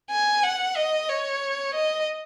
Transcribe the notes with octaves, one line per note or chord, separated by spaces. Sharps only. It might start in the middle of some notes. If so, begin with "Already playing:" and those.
G#5
F#5
D#5
C#5
D#5